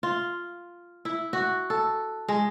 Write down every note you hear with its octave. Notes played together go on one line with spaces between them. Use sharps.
F4
E4
F#4
A4
G#3